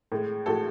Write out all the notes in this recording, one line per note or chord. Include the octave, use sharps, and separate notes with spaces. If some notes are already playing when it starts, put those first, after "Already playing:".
A2 G#3
A2 G#3 F#4 A4